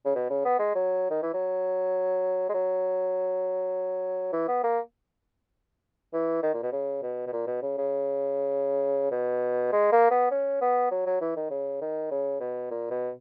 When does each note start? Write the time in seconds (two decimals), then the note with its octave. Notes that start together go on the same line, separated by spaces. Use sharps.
0.05 C#3
0.15 B2
0.30 C#3
0.45 B3
0.59 G#3
0.75 F#3
1.10 D#3
1.23 E3
1.34 F#3
2.49 G#3
2.54 F#3
4.33 E3
4.48 B3
4.64 A#3
6.13 E3
6.43 D#3
6.54 A#2
6.63 B2
6.72 C#3
7.03 B2
7.27 B2
7.33 A#2
7.47 B2
7.62 C#3
7.78 C#3
9.11 B2
9.72 G#3
9.92 A#3
10.11 B3
10.31 C#4
10.61 B3
10.91 F#3
11.06 F#3
11.21 E3
11.36 D#3
11.51 C#3
11.81 D#3
12.11 C#3
12.40 B2
12.71 A#2
12.91 B2